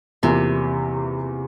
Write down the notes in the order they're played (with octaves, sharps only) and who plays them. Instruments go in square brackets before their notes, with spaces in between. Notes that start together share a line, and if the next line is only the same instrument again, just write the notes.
[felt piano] E2 E3 A#3 F4 [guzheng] C3